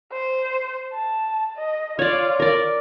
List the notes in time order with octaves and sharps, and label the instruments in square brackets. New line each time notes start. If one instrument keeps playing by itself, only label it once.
[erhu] C5
A5
D#5
[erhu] F4 [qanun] C#5 D5
[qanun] A#4 D5